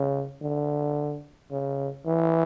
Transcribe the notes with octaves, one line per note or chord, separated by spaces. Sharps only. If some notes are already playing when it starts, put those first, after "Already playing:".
Already playing: C#3
D3
C#3
E3